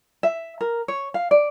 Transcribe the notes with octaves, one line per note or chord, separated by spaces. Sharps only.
E5
A#4
C#5
F5
D5